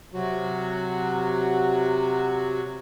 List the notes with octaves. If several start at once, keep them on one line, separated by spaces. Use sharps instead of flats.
C3 F#3 F#4